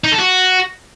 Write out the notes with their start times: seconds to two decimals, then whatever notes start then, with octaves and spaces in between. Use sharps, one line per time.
0.04 D#4
0.12 A4
0.19 F#4